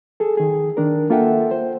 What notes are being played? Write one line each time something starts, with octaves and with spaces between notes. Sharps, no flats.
G#4 A4
D#3 G#4
D#3 D4 A#4
A#3 F4 A4 E5 F#5 G5
C5